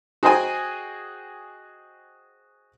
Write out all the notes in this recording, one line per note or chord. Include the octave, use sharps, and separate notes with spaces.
F#4 G#4 C5 D#5 G5 G#5